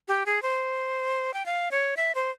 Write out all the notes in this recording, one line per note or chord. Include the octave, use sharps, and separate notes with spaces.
G4
G#4
C5
G5
F5
C#5
E5
C5